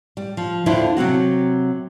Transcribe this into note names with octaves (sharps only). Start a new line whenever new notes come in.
G3
F3
D#2 D3 D4 E4 F4 C5
C3 F#3 C4 F#4